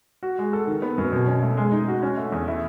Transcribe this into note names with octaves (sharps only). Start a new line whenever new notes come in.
F#4
G#3
A4
D#3
B3
F#2
B2
C#4
A3
G#3
D#4
F#4
C#4
A3
E2
E4